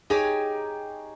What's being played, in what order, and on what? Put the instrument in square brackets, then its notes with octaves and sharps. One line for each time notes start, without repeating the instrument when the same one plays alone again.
[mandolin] D#4 G4 C#5 G#5 [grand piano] G#4